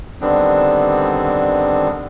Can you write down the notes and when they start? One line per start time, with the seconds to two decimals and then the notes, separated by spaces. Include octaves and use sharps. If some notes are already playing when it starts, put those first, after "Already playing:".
0.21 D3 D#3 G3 B3 C4 D4